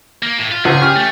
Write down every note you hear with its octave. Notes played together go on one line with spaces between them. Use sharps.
A#3
A2
F4
C#2 F3 G#4 F#5
C#4 G4 F6
A3